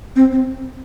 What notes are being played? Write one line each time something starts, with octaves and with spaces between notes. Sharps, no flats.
C4
C4